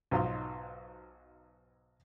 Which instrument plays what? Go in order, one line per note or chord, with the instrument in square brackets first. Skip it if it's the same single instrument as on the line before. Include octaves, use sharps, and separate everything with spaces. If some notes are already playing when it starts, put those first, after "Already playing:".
[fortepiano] B1 G#2 F#3 D#4 F4 C6